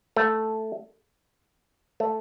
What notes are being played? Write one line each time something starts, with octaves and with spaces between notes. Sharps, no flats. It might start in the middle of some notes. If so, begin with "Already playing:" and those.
A3
A3